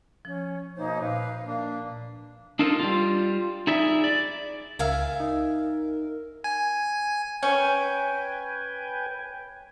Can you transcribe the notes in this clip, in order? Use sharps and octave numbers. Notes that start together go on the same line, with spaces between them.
F3 C#4
B2 A#3 D#4 C5 C#5
A#2 B4 F5
A#3 D4
D4 D#4 F4 A4 A#4 C5
G3 F4
D#4 E4 G#4 D5 E5
D5
C#2 A#4 E5 F5 G#5
D#4
G#5
C#4 B4 G5 G#5